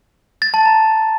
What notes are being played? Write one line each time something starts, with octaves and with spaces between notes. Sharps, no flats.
A6
A5
A#5